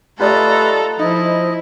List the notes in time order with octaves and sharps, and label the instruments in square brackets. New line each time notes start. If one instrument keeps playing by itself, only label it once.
[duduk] A3 [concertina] F4 B4 [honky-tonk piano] G4 D5 D#5 [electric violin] A4 A#5
[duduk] F3 [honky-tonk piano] D#4 [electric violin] E4 [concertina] D#5